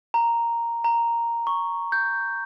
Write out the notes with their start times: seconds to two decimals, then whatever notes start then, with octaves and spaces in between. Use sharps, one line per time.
0.14 A#5
0.84 A#5
1.47 C#6
1.92 G6